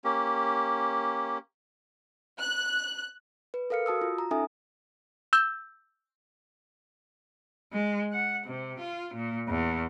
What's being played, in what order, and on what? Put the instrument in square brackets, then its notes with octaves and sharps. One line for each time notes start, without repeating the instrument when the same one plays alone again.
[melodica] A#3 C#4 G4
[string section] F#6
[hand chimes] B4
A4 A#4 F5 F6 C#7
F#4 A5 D#6 E6
F4
A#5
C#4 D#4 A4 E5 G#5 D#6
[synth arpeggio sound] E6 G6
[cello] G#3
F#5
C3
F4
A#2
E2